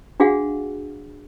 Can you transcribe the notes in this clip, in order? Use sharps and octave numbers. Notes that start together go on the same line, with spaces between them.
D4 F#4 G#4 F5 F#5